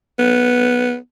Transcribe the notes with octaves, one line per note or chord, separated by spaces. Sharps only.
B3